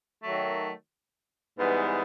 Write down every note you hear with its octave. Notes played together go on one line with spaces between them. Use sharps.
D#3 F#3 A3
G#2 E3 G3 B3